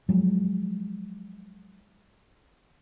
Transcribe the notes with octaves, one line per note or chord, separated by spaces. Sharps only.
F3 F#3 G#3